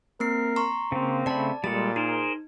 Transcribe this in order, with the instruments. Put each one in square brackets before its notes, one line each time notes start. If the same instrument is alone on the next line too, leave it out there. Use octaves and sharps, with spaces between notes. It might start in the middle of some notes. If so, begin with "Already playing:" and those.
[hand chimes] A#3 C4 C7 [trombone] A#4
[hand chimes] A#5 C6 C#6
[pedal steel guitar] C#3 A#3 [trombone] C4
[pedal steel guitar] C#3 A3 B5 [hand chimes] D5 A5
[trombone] A#2 [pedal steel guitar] G3 G#3 A4 [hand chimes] A6
[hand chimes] D#4 [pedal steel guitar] G#4 A#4 C5